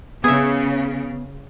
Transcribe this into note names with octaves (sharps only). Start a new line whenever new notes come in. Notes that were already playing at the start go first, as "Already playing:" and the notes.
C#3 B3 G#4 E5